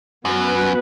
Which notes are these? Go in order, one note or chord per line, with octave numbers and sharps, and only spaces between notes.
F#2 B3 F#4 B4